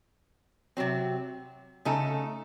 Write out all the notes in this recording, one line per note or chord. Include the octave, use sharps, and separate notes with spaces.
C3 F#3 C4
C#3 A3 D#4 A4